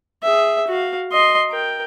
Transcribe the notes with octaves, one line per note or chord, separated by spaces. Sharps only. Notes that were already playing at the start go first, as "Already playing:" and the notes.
G#4 E5
F#4 F5
D#5 C6
A#4 G5